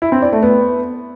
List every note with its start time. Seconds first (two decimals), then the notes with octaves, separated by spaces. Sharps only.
0.02 E4
0.12 C4
0.22 D5
0.32 A3
0.43 B3